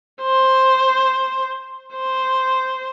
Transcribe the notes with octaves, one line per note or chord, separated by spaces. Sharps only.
C5
C5